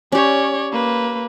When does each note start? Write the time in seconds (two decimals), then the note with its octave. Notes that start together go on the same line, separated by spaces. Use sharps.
0.12 C#4 G4 C#5 D5
0.73 A#3 B4